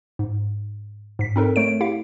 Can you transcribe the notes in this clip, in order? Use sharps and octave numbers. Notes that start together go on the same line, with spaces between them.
G#2
G#2 B6
C4 D#4 A4 A#4
A3 C#5 D7
E4 G4 F5